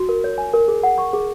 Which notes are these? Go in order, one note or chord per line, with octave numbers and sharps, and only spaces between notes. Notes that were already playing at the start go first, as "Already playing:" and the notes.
Already playing: F#4
A#4
C#5
G#5
A#4
G#4
F#5
C#6
G#4